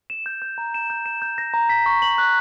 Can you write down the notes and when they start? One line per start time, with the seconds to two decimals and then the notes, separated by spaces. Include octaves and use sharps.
0.10 E7
0.26 G6
0.42 G6
0.58 A#5
0.74 E7
0.90 G6
1.06 E7
1.22 G6
1.38 A#6
1.54 A#5
1.69 B6
1.86 C#6
2.02 F#7
2.18 F#6